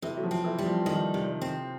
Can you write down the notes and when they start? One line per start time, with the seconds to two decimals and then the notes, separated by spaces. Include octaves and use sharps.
0.02 C3 E3
0.17 F#3
0.23 F3
0.31 C4
0.45 E3
0.59 G3
0.66 F3
0.86 D#3 F3
1.14 C3
1.41 C4